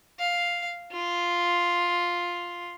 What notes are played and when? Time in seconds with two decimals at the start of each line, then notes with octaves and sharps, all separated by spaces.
0.20 F5
0.92 F4